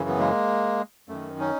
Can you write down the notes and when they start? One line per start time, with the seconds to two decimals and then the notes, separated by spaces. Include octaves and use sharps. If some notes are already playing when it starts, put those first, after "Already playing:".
Already playing: F#2 C#3 E3
0.09 B3
0.19 G#3 A#3
1.09 F#2 D#3 A3
1.40 C#4 D#4